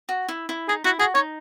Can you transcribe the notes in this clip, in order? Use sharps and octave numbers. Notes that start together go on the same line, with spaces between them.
F#4
E4
E4
D#4 G#4
E4 F#4
F#4 G#4
D#4 C#5